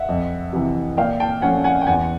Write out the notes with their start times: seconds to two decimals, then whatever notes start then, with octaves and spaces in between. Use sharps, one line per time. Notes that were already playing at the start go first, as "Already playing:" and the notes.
Already playing: E5 F#5
0.09 F2
0.53 C3 E3
0.97 A#2 F5 G5
1.20 G5 A5
1.42 F3 A3 C#4 F#5 G#5
1.64 F#5 G#5
1.81 G5
1.87 E2 F#5 G#5